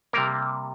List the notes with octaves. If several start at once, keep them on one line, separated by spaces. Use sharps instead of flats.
C3 G3 A#3 A#4